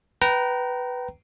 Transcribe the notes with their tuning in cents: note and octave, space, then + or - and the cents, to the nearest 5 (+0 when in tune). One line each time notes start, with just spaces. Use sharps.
B4 +0 G5 -30 A#5 +0